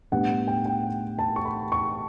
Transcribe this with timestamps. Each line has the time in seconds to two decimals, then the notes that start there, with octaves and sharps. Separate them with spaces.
0.12 A2 G3 B3 D4 F#5
0.47 G5
0.65 G5
1.19 A5
1.36 C#6
1.45 B5
1.72 C#6